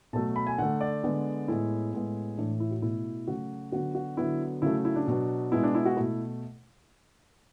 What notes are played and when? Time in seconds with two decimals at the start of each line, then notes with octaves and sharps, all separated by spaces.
0.13 B2 F#3 A3 A5
0.36 B5
0.47 G#5
0.58 D3 A3 F#5
0.81 D5
1.04 D3 G#3 B3
1.48 A2 G#3 B3 E4
1.93 A2 G#3 B3
2.38 A2 E3 A3 D4
2.60 E4
2.71 F#4
2.82 B2 A3 E4
3.27 C#3 F#3 A3 F#4
3.72 D3 F#3 B3 F#4
3.95 F#4
4.17 D3 F#3 B3 E4
4.62 C#3 F#3 A3 E4
4.85 E4
4.96 D4
5.07 B2 F#3 B3
5.52 B2 G#3 B3 E4
5.63 D4
5.75 E4
5.86 F#4
5.97 B2 A3 E4